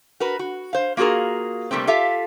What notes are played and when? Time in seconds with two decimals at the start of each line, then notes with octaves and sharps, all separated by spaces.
0.20 F#4 A#4 B4
0.39 F#4
0.73 C5 F5
0.97 A#3 F4 F#4 G#4 A#4
1.71 C3 G3 A3 A#3 C4
1.87 F4 G4 A4 E5 F5